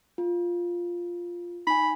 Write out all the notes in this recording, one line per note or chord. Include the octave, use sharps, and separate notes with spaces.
F4
D#4 G#5 B5